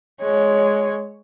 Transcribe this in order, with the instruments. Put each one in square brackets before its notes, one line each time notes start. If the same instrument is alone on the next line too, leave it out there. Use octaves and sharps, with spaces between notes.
[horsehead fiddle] G#3 C#5